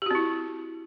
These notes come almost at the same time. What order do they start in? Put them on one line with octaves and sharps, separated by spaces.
G4 F#4 C4 E4